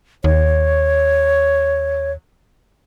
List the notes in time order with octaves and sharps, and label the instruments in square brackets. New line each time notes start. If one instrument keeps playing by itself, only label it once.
[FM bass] D#2 [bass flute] C#5